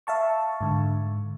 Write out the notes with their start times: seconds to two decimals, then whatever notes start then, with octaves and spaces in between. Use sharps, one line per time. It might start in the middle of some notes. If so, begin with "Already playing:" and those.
0.07 E5 F5 A5 C#6
0.61 G#2 D3